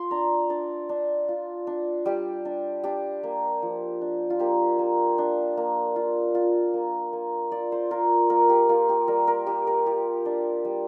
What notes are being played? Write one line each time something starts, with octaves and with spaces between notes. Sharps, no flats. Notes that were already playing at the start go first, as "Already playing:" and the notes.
Already playing: F4 C6
D4 A#5
D4 D5
D4
F4
D4
G3 G4
D4
D4 G4
A#3
F3
D4
F4
A#3 G4
A#3
D4
A#3
F4
F4
A#3
A#3
F4 D5
C5
F4 A#4
A#3 A#4
G4
A#3 F4
G4
G3 A#4
A#4
G3 G4
A#4
F4 G4
D4
G3